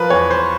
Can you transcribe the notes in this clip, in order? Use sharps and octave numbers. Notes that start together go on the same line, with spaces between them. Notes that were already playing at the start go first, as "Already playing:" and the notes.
Already playing: F3 A#4 B4
E2 C#5
C5